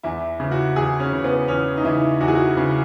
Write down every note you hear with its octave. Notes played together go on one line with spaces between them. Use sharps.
E2 E4
C#3 E3
F#4
E2 G#4
C#4
C#3 E3
B3
E2 C#4
D#4
C#3 E3 E4
E2 F#4
G#4
F#4
C#3 E3